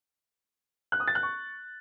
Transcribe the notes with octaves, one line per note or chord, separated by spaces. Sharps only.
F#6
D#6
A6
F#6
C#6